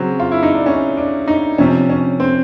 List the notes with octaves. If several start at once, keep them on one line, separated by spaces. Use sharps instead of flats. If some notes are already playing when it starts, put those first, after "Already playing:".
Already playing: C#3 F#3 C4
F4
E4
D#4
D4
C#4
D4
D#4
C3 F3 C#4
C#4
C4